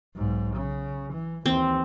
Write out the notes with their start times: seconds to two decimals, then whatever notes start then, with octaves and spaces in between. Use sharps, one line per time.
0.16 B1 G#2
0.55 C#3
1.13 E3
1.46 D#2 E3 C4